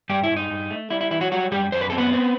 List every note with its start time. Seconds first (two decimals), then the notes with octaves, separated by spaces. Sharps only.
0.09 G2 G3 G4
0.24 E4
0.30 G2
0.36 D#4
0.50 G2
0.71 A3
0.90 G3 E4
1.01 E4
1.11 E3 E4
1.21 F#3 F#4
1.32 F#3 G3 F#4
1.51 F#2 G3 G4
1.72 F#2 C5
1.81 B4
1.90 C4 A4
1.98 B3 B4
2.13 C4